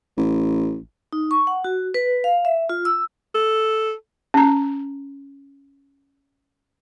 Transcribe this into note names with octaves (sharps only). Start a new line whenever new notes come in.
A1
D#4
C#6
F#5
F#4
B4
F5
E5
F4
E6
A4
C#4 A#5